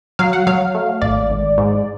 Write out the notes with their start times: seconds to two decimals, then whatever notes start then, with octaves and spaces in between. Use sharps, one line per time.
0.19 F#3 F5
0.33 F#5
0.47 F#3 F5
0.75 A3
1.02 G#1 D5
1.30 G#1
1.58 G#2